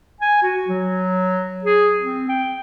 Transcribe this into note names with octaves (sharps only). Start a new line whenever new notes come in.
G#5
F#4
F#3
G#4
C4
G5